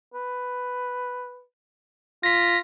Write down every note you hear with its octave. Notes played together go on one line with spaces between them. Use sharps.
B4
F4 A#6 B6